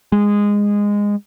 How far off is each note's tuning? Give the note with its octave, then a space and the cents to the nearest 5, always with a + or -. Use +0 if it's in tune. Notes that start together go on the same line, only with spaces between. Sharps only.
G#3 -15